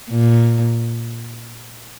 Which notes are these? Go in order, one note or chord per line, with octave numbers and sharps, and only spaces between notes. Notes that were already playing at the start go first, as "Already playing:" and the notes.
A#2